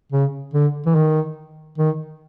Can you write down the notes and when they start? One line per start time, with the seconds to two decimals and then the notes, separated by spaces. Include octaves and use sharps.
0.12 C#3
0.54 D3
0.86 E3
0.95 D#3
1.78 D#3